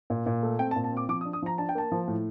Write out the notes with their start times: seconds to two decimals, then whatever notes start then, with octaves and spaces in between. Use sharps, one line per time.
0.10 A#2
0.26 A#2
0.43 A3
0.59 C4 G5
0.71 A5
0.76 A#2
0.84 A5
0.92 C4 D6
1.09 F3 D6
1.21 D#6
1.25 D4
1.33 D#6
1.42 F3 A#5
1.58 D4 A5
1.69 G5
1.75 A#3 A5
1.92 F3
2.08 A2